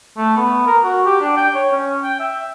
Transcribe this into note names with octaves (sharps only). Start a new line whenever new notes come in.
A3
B3
A#4
F#4
G4
D4
G5
C#5
C#4
G5
E5